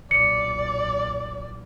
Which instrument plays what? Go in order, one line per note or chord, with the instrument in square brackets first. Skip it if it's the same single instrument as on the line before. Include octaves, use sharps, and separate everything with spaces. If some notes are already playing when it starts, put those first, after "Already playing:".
[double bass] B1 A#2 [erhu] D5 [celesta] C#7